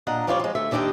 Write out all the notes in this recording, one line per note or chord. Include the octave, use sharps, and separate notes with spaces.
A#2 D4 D#5 F#5 A#5
F3 G3 C#4 F4 C#5 D5
F3 G#3
D2 A3 E5
D#2 D#3 D4 F#4 G4 D#5